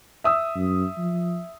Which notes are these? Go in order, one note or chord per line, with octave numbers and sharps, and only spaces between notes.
E5 D#6 E6
F#2
F3